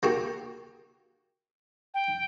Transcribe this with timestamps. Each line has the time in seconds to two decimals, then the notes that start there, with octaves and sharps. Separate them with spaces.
0.03 A#3 F#4 G4
1.94 G5